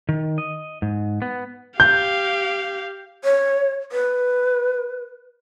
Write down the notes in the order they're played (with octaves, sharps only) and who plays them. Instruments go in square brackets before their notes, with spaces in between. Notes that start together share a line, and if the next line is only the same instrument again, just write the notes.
[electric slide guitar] D#3
D#5
G#2
B3
[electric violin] G4 F5 [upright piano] G6
[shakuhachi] C#5
B4